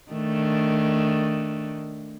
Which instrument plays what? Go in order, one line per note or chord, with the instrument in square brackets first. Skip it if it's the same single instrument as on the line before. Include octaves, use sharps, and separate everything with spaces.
[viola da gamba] D#3 A3 D4